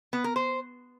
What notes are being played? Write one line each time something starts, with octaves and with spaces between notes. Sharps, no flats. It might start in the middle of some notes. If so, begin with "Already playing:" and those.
B3
A#4
C5